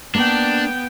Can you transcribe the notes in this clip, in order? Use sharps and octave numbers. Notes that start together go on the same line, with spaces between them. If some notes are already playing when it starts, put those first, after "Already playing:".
A#3 B3 D4 G5